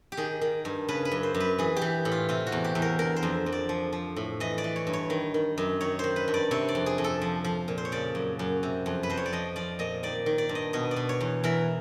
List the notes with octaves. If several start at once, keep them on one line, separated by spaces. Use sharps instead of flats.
G4
D#3 G#4
D#3
G2
C#3 B4
B4
F#2
C5
F#2
B4
E3 G#4
G4
E3
A2
F4
C3 F4
F#4
E2
G4
E2
A#4
D3 A#4
C5
F2
F2
D5
F3
F3
A2
E3 D#5
D5
E3
C#5
G2
C#5
D#3
D#3
F#2
D#3 C#5
D#3 C5
B4
G2
D5
C3 C#5
D5
F2
G#4
F2
A4
F3
F3
A#2
C5
C#5
C#3 D5
F#2
F#2
C3
F2
B4
F2 C5
C#5
D5
F3 D#5
F3 D5
A#2 D#5
D#3 D5
D#3
D5
G2
D#5
B2 D#5
D5
B2
C#5
E2
E3 A#4